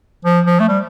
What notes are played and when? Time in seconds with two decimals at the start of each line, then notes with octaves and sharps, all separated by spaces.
0.25 F3
0.46 F3
0.60 A3
0.69 G3